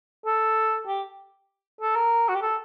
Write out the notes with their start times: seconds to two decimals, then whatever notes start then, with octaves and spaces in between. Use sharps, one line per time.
0.26 A4
0.87 G4
1.81 A4
1.96 A#4
2.29 F#4
2.35 G4
2.42 A4